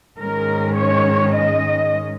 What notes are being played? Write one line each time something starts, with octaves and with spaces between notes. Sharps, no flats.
G#2 D#3 G#3 C#4 A#4
C#5
D#5